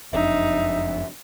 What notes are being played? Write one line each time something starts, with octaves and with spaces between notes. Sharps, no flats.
F#1 F2 D4 D#4 E5